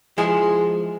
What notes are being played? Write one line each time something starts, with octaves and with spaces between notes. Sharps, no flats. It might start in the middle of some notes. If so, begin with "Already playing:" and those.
F3 G#3 E4 G#4